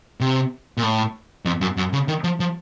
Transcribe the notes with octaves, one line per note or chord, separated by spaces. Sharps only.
C3
A#2
A2
F2
F#2
F#2
C#3
D#3
F3
F3